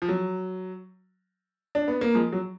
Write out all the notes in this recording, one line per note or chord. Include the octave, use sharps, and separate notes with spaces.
F3
F#3
D4
B3
A#3
F3 G#3
F#3